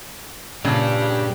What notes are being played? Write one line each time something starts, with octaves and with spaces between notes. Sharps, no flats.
A#2 C#3 G3 D4 G4